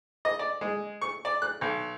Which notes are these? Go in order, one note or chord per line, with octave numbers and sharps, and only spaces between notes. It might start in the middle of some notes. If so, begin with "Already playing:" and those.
D#5
D5
G#3
C#6
D5
F#6
B1